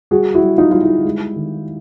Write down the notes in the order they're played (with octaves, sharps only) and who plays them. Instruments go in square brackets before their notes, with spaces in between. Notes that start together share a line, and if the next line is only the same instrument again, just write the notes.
[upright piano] G3 F#4 G#4
E4 F#4
G3
D#4 F4
G3 F4
E4
G#3
D#3